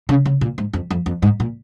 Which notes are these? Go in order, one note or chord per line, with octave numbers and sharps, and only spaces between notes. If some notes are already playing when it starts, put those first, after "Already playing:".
C#3
C#3
A#2
G#2
F2
F2
F2
G#2
A#2